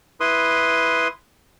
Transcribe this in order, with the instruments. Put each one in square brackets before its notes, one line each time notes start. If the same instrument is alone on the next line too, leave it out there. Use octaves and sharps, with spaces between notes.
[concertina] E4 B4 C6 D#6